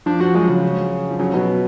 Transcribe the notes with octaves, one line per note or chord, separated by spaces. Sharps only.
F3 D4
F3 F#4
F#3 G#3
C#3
F3
C#3 F#3
B2 F#3